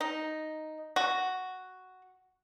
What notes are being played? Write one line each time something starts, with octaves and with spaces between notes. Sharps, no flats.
D#4
F#4